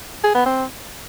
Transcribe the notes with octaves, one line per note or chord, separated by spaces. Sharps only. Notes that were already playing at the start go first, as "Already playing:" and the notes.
G#4
B3
C4